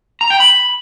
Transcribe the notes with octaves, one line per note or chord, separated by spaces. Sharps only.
A#5
G5
B5